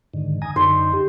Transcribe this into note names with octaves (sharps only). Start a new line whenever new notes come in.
G#2 D3 D#3
G#5 A#5 D#6
F#2 D3 D#4 C5
G4